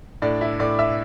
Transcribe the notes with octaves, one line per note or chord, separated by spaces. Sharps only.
A2 D4 D5
E4 E5
A2 D5 D6
E5 E6